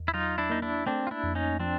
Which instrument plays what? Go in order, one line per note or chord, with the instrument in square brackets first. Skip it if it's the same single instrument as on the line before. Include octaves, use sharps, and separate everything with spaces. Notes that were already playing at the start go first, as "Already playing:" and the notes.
Already playing: [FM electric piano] E2
[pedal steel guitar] E4
[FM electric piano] F#3 [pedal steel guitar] D#4 F4
[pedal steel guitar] D4 E4
[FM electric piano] A#3 [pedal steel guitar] D#4
[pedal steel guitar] D4 E4
[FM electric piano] A3 [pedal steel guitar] C4 D4
[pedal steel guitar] F4
D4 E4
[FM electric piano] F2
[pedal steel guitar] C#4 D#4
[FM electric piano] F3 [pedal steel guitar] C4 D4